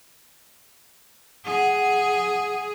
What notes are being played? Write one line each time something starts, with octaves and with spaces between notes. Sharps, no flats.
G#4 F#5